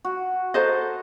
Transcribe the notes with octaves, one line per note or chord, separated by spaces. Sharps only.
F#4
A4 C5 D#5 A#5